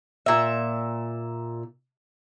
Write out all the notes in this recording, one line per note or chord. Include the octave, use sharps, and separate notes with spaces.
A#2 E5